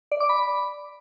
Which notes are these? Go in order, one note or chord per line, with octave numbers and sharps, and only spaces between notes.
D5
D6
B5